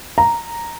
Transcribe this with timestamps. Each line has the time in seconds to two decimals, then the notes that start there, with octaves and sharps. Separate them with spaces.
0.18 A#5